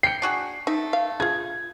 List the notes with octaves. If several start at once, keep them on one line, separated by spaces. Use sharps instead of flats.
G5 C7 C#7
D4 F#4 G#4
A3 D#4
F5
F4 G#4 G#6